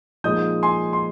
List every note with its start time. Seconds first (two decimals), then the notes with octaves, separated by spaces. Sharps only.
0.24 A#2 F3 G#3 D#4 D#6 G6
0.63 G#5 C6
0.93 C6